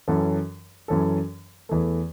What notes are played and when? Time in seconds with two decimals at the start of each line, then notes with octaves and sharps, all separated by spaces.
0.08 F#2 E3 C#4 A4
0.88 F#2 E3 C#4 A4
1.69 E2 E3 A3